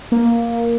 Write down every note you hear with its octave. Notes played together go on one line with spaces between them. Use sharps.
A#3